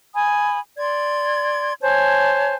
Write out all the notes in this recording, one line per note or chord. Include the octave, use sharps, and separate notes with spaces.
G#5 B5 D#6
D5 C6 G#6
C5 C#5 G#5 A5